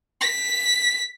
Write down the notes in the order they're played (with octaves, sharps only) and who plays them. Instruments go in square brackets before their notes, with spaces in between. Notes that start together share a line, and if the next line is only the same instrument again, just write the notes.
[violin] B6